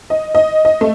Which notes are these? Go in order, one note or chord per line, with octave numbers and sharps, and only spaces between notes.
D#5
D#5
D#5
A3